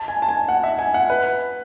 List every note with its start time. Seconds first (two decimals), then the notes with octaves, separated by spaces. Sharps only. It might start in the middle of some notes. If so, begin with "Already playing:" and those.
Already playing: A5
0.08 G#5
0.22 A5
0.29 G#5
0.49 F#5
0.64 E5
0.79 G#5
0.94 F#5
1.10 B4